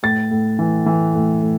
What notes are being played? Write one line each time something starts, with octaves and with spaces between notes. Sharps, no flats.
A2 A6
A2
E3
E3
A2
A2